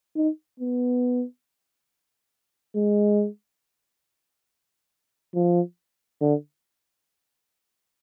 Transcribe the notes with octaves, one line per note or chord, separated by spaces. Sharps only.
D#4
B3
G#3
F3
D3